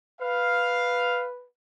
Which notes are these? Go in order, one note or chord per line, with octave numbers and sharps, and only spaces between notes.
B4 F5